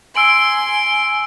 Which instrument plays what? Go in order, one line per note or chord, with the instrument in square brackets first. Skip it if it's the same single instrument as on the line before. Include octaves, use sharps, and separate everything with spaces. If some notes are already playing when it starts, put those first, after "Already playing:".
[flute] G#5 [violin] C6 [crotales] E6 D7 F#7